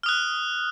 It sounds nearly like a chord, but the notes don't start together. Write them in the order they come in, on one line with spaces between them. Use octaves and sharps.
F6 D#6 F#6